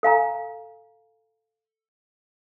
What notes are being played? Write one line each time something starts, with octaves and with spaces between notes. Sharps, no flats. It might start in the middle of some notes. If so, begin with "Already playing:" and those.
A4 F5 G#5 A#5